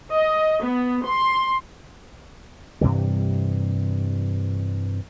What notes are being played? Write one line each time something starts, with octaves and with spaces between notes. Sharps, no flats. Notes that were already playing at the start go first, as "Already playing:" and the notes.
D#5
B3
C6
G2 C3 E3 G3